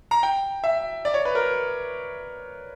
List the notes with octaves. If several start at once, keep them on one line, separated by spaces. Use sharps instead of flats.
A#5
G5
E5
D5
C#5
B4
A#4